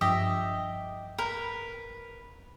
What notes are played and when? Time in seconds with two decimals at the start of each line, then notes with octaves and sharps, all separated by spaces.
0.01 G2 F3 G4 D#5 E5
1.18 A#4 B4